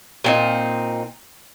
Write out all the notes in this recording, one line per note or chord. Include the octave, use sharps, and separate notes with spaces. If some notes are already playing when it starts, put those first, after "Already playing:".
A#2 C4 D#4